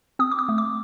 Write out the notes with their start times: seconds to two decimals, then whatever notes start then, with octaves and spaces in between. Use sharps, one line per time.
0.19 C4 D#6
0.31 D6
0.39 D#6
0.49 A3
0.58 D6